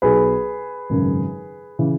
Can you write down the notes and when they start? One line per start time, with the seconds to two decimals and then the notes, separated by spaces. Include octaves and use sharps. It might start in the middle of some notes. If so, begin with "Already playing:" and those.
0.02 B1 B2 G#4 B4
0.90 G#1 F#2 C#3
1.79 C#3 E3